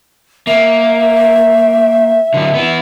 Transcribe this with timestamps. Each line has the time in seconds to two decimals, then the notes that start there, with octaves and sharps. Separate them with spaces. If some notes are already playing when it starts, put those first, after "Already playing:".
0.47 A#3 E5
2.34 D3 F#3
2.55 B3 E4